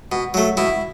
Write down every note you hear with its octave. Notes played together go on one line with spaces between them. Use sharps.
B2
F#3 A3
B2 E4